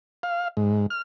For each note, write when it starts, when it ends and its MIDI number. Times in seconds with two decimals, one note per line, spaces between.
0.23 0.48 77
0.57 0.86 44
0.90 1.02 89